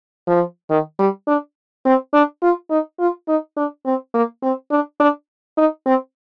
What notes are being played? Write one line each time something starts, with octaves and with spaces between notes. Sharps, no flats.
F3
D#3
G3
D4
C4
D4
F4
D#4
F4
D#4
D4
C4
A#3
C4
D4
D4
D#4
C4